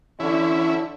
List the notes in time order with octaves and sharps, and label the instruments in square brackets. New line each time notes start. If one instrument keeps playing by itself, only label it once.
[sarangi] D3 [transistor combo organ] E3 C#4 E4